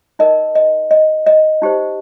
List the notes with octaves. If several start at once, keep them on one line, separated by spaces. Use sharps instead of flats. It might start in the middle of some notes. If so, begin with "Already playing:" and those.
D#4 A#4 D#5
D#5
D#5
D#5
D#4 G4 C5